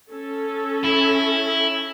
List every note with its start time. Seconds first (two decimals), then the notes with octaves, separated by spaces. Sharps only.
0.11 C#4 A4
0.84 E4